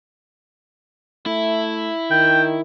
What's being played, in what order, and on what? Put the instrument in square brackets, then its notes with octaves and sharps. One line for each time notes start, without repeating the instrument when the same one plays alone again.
[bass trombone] A3 [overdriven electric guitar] E4
[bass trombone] D#3 [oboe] G5